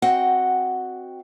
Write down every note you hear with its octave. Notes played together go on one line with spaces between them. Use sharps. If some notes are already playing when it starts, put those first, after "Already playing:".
C4 F#4 D#5 F#5 G5